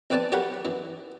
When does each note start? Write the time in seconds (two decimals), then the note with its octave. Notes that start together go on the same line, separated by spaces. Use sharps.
0.10 A#1 C4 B4 D5 G#5 A5
0.32 F#3 G4 A#4 C#5 F#5 B5
0.65 F#2 E3